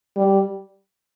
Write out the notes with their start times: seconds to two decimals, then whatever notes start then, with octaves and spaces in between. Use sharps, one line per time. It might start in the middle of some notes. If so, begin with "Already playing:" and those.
0.16 G3